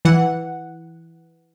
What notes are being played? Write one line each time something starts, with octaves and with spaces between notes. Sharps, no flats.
E3 F#5